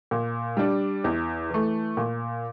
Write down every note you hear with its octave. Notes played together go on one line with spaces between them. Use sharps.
A#2
G3 D4
E2
E3 A3
A#2